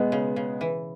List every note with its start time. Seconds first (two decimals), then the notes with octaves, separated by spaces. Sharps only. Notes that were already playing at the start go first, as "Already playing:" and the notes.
Already playing: B2 G#3 B3
0.12 C#3
0.36 C#3
0.61 E3